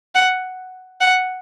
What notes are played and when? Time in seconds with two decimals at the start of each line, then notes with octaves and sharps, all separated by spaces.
0.15 F#5
1.01 F#5